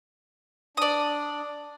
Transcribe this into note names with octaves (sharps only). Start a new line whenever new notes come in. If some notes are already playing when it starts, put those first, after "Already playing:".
D4 D5 D#6